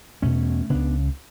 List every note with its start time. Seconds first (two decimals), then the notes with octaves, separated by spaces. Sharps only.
0.22 E2 B2 A3 C#4
0.70 C#2 C#3 B3 D4